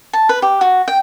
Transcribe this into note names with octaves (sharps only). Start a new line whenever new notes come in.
A5
B4
G4
F#4
G5